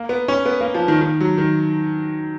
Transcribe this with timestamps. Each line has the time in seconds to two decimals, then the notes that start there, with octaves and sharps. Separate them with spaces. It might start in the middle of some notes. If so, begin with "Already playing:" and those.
Already playing: A#3
0.09 B3
0.28 C#4
0.46 B3
0.61 A#3
0.74 F3
0.88 D#3
1.01 D#3
1.20 F#3
1.38 D#3